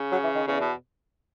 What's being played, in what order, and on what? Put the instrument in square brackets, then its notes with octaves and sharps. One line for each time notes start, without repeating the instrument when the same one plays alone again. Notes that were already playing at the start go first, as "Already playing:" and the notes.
Already playing: [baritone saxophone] C#3
[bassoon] F#3
E3
D#3
[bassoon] E2 [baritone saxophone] C#3
[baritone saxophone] B2